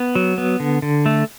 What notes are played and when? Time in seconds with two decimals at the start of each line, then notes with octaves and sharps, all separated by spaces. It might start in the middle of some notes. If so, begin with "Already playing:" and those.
Already playing: B3
0.15 F#3
0.38 B3
0.60 D3
0.82 D3
1.06 A3